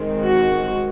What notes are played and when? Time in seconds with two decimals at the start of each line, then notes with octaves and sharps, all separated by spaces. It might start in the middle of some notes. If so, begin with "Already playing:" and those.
Already playing: D#3 G#3 C4
0.22 F#4